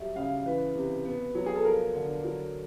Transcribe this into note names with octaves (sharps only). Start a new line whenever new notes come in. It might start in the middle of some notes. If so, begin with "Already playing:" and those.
Already playing: F#3 G3 E5
C#3 F5
E3 B4
C3
B3
F#3
G#4
A4
F3 A#4
D3
F#3